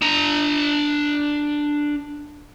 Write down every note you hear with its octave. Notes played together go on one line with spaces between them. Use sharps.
D4 A#5